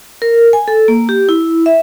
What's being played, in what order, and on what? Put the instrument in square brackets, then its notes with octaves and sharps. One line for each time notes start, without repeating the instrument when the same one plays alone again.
[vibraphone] A#4
G#5
A4
A#3
G4
E4
E5